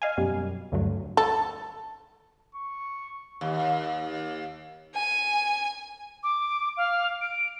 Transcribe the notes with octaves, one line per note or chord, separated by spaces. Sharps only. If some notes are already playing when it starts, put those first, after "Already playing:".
D#5 F5 G#5
F#2 B2 F#3 G3
D2 G2 D3 F#3
A4
C#6
D#2
G#5
D6
F5
D7